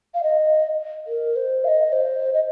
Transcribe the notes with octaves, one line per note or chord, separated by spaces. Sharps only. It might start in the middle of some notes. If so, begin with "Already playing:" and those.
F5
D#5
A#4
C5
F5
D#5
C5
D#5